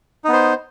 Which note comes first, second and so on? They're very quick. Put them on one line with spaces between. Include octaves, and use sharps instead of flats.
D#4 B3 C5